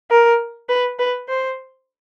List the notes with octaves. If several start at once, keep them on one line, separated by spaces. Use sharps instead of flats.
A#4
B4
B4
C5